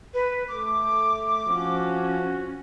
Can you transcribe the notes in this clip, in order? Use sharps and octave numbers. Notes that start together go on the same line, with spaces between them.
B4
A3 D6
F3 C#4 F#4